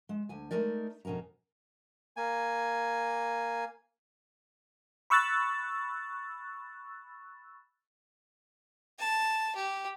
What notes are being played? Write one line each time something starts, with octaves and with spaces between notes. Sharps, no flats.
G#3
D2 G#5
G#3 A3 D#4 A#4 D5
F2 B2 C#4 A#4 A#5
A#3 G#5
B5 C#6 E6 F#6 A6
A5
G4